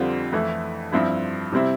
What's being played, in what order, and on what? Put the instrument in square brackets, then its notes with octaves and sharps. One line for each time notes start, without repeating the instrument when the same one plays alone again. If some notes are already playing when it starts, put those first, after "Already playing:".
Already playing: [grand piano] F2 D3 G3 C4 F4
F2 E3 A3 E4
G2 F3 C4 E4
C3 G3 C4 E4